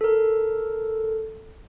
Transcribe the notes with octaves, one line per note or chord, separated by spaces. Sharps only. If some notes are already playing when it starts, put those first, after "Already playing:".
A4 A#4